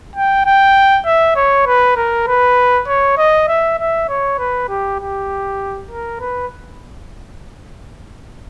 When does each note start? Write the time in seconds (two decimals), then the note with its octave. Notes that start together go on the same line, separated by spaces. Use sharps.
0.15 G5
0.46 G5
1.06 E5
1.36 C#5
1.66 B4
1.96 A#4
2.27 B4
2.88 C#5
3.18 D#5
3.48 E5
3.79 E5
4.09 C#5
4.39 B4
4.69 G4
5.00 G4
5.91 A#4
6.21 B4